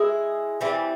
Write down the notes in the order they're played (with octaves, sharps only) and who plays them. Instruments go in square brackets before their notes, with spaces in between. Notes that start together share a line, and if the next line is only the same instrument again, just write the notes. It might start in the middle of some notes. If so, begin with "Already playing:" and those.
Already playing: [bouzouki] G#3 E4 G#4
E3 G3 C4